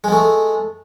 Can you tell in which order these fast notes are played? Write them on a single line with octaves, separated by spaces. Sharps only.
G#3 B3 A3